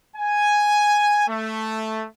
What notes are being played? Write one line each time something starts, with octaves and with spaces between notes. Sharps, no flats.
G#5
A3